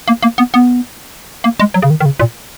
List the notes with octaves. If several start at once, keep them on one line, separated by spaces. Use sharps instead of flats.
A#3
A#3
B3
B3
A#3
G#3
F#3
C#3
D#3
D#3
C#3
A#2